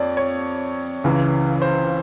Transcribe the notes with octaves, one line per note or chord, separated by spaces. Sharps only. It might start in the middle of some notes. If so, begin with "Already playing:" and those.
Already playing: F2 C#5 D5
C#5
C#2 C#3 E3
C5